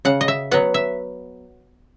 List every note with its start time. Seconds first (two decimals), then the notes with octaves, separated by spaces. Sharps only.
0.05 C#3 F#5
0.21 D#5
0.28 E5
0.51 F#3 B3 F#5
0.74 E5